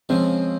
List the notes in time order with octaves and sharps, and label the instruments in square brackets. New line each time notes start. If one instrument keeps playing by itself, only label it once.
[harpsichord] C#3 F3 G#3 [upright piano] C4